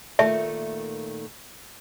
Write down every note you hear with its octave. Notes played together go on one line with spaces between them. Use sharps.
A#2 D#3 A3 E5